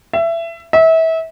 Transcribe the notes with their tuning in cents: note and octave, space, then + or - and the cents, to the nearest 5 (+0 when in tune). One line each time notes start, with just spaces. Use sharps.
E5 +20
E5 -30